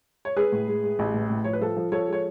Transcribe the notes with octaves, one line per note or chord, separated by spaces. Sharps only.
C#5
G#3 G#4 B4
A2
G#3
G#3
A1
A2
A2
F3 C#5
B4
F3 A4
F3
F3 A4 C#5
G#3
C#5